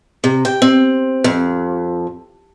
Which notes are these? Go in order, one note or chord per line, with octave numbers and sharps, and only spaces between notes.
C3
G5
C4
F2